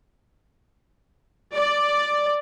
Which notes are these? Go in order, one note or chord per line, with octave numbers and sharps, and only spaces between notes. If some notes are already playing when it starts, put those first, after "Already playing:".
D5